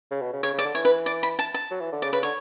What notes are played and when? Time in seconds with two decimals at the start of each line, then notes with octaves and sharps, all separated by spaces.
0.11 C#3
0.22 B2
0.33 C#3
0.43 C#3 C#5
0.54 C#3
0.59 D5
0.65 D3
0.75 E3 C#5
0.85 B4
1.06 D5
1.23 B5
1.39 A5
1.54 A5
1.71 F#3
1.81 E3
1.92 D3
2.02 C#3 D5
2.13 C#3 B4
2.23 D3 C#5